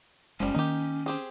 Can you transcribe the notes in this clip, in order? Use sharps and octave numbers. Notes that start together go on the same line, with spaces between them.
F#1 F3 G3 G#3 C#4
D#3 A#3 D#4 G4
C4 G4 G#4